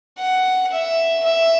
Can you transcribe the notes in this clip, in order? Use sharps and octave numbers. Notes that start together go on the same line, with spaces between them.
F#5
E5
E5